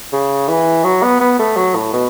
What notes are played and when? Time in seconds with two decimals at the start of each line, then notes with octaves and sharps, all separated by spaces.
0.13 C#3
0.48 E3
0.84 F#3
1.03 B3
1.20 B3
1.39 A3
1.57 F#3
1.75 A2
1.93 B2